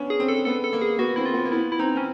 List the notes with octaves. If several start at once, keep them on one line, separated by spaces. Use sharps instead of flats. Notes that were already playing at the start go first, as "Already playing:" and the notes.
Already playing: B3 C#4 D4
G#4
C4
A4
B3 A4
A4
A#3
G#4
B3 F#4
C4 E4
F4
B3
A#3
B3 E4
E4
C4 D#4
C4 C#4